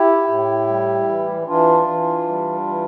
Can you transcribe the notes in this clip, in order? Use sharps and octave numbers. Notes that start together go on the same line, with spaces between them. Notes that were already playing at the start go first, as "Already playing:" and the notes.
Already playing: E4 G4
A2
G3
E3
E3 D4 F4
E3
G3
E3